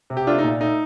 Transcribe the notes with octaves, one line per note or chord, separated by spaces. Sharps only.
C3
G4
A3 D4 F4
D#4
A#2
A3 D#4